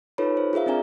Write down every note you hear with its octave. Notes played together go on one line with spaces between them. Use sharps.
D#4 F4 A4 B4 C#5 B5
C5
F4 G#4 A#4 E5 F5
C4 D4 G#4 D5 G#5 A#5